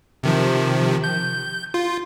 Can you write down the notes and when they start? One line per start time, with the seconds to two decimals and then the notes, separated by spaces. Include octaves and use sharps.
0.23 C3 D#3 F3
1.04 G6
1.74 F4